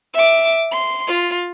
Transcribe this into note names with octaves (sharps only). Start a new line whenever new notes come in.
E5 D6
C6
F4